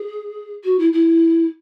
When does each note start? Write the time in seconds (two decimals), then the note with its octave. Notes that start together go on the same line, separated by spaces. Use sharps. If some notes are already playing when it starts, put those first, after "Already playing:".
Already playing: G#4
0.64 F#4
0.79 E4
0.92 E4